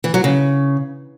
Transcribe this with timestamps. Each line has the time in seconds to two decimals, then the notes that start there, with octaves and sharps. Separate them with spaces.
0.04 E3
0.14 F#3
0.24 C#3